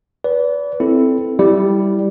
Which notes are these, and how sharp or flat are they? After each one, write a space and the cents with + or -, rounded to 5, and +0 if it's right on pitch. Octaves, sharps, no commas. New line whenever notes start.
B4 +0 D5 -35
C4 +0 E4 +0 A4 -10
G3 +0 E4 +0